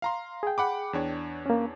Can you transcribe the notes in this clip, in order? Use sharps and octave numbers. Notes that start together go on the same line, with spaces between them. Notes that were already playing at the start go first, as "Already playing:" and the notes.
F5 A#5 C6
G#4 G5
F#5 B5 D6
E2 D4 C#5
A#3 C#4